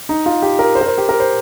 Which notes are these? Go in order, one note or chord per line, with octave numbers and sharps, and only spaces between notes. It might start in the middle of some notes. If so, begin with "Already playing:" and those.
D#4
F4
G4
A#4
C5
A#4
C5
G4
A#4
C5